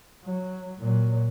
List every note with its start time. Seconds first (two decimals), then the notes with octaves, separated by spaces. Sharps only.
0.23 F#3
0.78 A#2 F#3